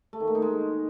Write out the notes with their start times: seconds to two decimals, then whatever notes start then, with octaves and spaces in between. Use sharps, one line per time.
0.13 A3
0.20 D#3
0.27 A#3
0.35 D#4
0.42 G#3